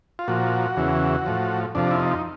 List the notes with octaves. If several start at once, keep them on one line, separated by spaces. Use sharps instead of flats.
F4
A#2 F3 F#4
E2 C#3 E3
A2 F3
F2 C3 F3 D4
E4
D#4